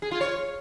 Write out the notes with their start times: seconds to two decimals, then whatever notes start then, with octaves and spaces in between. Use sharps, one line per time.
0.02 G#4
0.11 F4
0.21 C#5